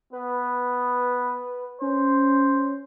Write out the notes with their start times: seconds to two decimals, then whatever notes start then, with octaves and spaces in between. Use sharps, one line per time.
0.13 B3 B4
1.82 C#4 C5